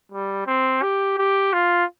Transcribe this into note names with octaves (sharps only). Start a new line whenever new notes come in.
G3
C4
G4
G4
F4